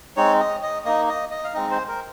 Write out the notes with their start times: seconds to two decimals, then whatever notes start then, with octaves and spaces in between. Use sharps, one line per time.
0.17 G#3 C4 D#4 C#5
0.40 D#5
0.63 D#5
0.85 A#3 D#4 D#5
1.09 D#5
1.31 D#5
1.44 F5
1.53 G#3 C4 D#4 D#5
1.71 C5
1.88 A#4